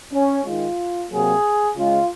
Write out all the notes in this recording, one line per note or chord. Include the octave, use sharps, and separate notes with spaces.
C#4
D#3 G#3 F4
C3 F#3 A#3 G#4
C#3 G#3 F4